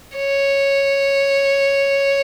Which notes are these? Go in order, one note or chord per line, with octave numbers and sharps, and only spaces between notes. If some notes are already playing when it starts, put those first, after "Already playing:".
C#5